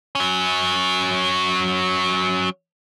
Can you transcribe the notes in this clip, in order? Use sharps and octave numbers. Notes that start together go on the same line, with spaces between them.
F#3 C#4